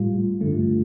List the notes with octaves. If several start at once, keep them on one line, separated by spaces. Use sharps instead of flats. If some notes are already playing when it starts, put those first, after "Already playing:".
Already playing: A2 G3 F4
G2 D3 A3